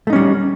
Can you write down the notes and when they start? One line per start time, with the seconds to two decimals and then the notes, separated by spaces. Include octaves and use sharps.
0.07 A3
0.10 D#4
0.13 C#4
0.16 G3